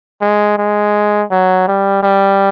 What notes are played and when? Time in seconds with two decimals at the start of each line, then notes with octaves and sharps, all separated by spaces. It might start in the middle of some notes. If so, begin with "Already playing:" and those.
0.21 G#3
0.58 G#3
1.31 F#3
1.68 G3
2.03 G3